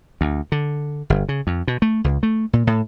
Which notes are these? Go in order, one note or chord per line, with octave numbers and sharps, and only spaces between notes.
D2
D3
G1
C#3
F2
B2
A3
C#2
A3
A#2
A2